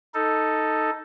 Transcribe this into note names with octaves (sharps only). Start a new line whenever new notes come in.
D#4 A4